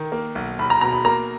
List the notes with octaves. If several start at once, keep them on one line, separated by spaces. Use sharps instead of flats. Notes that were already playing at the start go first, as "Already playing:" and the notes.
Already playing: D#3
A#3
B1
B1 B5
A#5
B2 A#5
B5
A#3 A#5